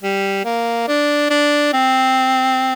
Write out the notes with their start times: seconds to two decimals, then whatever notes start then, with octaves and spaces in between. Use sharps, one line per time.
0.03 G3
0.45 A#3
0.88 D4
1.30 D4
1.73 C4